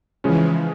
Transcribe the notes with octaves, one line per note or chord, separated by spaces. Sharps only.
C#3 E3 F3 G#3 C#4